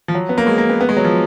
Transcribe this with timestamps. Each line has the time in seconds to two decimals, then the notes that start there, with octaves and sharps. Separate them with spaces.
0.08 F3
0.15 F#3
0.29 B3
0.38 A#3
0.47 G#3
0.58 A#3
0.70 B3
0.81 B3
0.89 G#3
0.97 F#3
1.04 F3